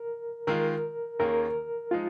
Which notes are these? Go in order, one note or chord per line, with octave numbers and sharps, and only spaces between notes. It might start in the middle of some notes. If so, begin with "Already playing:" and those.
Already playing: A#4
D#3 G#3 F4 A#4
D#2 D#3 A#3 C#4 G#4 A#4
F3 G#3 D#4 F4